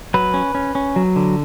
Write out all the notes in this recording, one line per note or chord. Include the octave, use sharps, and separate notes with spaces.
F#3 B4
C#4
C#4
C#4
F#3
D3